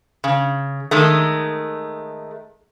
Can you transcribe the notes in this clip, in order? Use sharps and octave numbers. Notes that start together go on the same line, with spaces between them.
C#3
D#3 G#3 A3